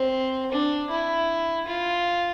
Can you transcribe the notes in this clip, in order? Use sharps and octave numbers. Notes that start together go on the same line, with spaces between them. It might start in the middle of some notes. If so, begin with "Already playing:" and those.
Already playing: C4
D4
E4
F4